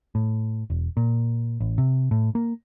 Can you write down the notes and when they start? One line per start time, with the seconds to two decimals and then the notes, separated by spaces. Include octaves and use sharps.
0.15 A2
0.70 E1
0.97 A#2
1.60 A1
1.78 C3
2.11 A2
2.35 A#3